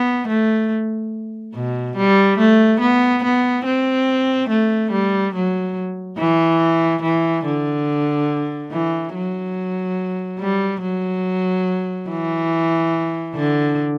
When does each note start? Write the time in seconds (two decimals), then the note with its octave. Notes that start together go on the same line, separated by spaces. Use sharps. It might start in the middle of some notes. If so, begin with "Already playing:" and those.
Already playing: B3
0.28 A3
1.55 B2
1.97 G3
2.39 A3
2.81 B3
3.24 B3
3.66 C4
4.50 A3
4.92 G3
5.34 F#3
6.18 E3
7.03 E3
7.45 D3
8.71 E3
9.14 F#3
10.40 G3
10.82 F#3
12.09 E3
13.35 D3